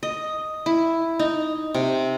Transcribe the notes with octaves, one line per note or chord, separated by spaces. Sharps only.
D#5
E4
D#4
C3